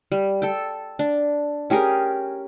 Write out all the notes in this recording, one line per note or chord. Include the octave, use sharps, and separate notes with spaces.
G3
A4 G5
D4
C#4 G4 G#4 A#4